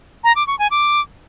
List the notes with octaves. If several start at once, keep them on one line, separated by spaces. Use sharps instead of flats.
A#5
D6
C#6
G#5
D6